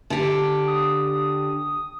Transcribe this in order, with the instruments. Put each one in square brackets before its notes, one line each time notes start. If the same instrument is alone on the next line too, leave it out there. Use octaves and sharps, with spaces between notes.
[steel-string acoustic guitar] D3 G4
[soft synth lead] D#6